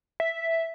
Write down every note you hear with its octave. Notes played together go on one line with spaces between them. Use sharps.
E5